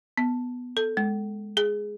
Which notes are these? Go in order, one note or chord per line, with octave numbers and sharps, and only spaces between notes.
B3
A4
G#3
G#4